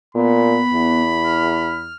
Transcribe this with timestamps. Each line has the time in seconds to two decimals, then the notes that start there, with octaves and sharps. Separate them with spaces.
0.15 A#2 B3 B5
0.73 E2
1.24 F6